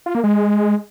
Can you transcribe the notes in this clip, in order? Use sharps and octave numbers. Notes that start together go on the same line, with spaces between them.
F4
A#3
G#3